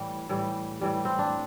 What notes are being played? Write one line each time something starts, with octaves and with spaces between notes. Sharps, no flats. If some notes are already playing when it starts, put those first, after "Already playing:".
Already playing: A2 E3 G3
A2 E3 G3
A2 E3 G3
C4
D4